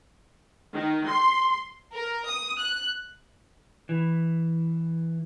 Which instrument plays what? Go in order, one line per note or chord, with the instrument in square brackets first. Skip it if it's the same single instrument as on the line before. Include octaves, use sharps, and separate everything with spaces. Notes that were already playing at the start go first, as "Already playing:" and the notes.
[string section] D#3
C6
[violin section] A#4
D#6
F#6
[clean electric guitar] E3